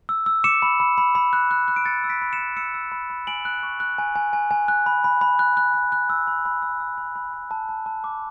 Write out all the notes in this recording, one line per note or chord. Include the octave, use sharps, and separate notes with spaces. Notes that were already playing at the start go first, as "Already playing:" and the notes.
E6
E6
D6 C#7 E7
B5
B5
B5
B5
F#6
F#6
F#6
D7
B5 A6 C#7
E6
B6 D7
B5
C#7 E7
B5
E6 C#7 E7
E6
B5
B5
G#5 D7 F#7
F#6
C#6
F#6
G#5
G#5
G#5
G#5
F#6
B5
B5
B5
F#6
F#6
B5
F#6
E6
B5
B5
E6
E6
B5
B5
B5
A5
A5
A5
D6